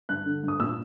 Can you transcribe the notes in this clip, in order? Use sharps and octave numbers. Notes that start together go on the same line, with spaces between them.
G2 F#6
D3
G2
D#6
A#2 E6